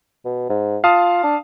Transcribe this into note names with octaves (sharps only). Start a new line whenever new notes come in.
B2
G#2
F4 F5 A5 D#6
D4